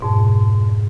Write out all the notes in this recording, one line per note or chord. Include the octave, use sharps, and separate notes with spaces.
F2 G#2 B2